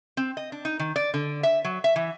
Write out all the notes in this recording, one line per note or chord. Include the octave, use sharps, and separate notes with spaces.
C4
D#5
D4
D#4
D#3
D5
D3
E5
F#3
E5
E3